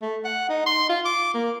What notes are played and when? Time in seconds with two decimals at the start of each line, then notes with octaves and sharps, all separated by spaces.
0.02 A3
0.25 F#5
0.49 D#4
0.66 C6
0.89 F4
1.05 D6
1.34 A#3